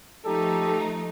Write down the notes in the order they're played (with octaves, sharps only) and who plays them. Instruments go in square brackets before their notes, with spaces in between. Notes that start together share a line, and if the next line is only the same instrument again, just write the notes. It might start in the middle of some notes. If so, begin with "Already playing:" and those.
[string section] F3 A3 D#4 [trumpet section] G4 A4